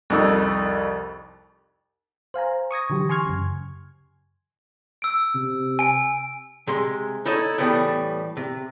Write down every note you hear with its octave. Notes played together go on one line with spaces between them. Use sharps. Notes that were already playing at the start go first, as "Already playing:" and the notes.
C2 F2 D#4 E6
C5 F5 G#5 A#5
C#6 D#6 G#6 A#6
D3 E3 F#3 G4
G#5 C6 C#6 F6 G#6
F#2 C#3
E6 D7
C3
G#5 D7
C3 G#3 C6
D#4 E4 A4 C#5 D#5
A2 E3 G3 B3 A4 G5
C3